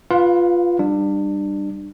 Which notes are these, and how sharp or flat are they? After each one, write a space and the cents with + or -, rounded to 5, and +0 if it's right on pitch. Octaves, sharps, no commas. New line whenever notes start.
F4 +0 B4 +0 F5 +30
G3 +0 D4 +25